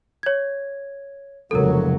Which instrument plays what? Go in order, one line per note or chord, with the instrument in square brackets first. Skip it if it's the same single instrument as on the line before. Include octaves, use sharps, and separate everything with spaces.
[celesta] C#5 G#6
[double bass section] F1 C#2 F#3 [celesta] A4 A#4